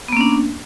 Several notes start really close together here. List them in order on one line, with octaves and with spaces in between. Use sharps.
B3 A#3 C#4 D4